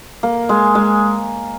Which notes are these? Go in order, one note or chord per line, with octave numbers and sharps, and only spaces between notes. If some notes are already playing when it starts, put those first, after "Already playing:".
A#3
G#3
G#3